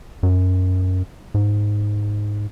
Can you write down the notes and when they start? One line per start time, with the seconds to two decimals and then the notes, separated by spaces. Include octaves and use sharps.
0.23 F#2
1.34 G#2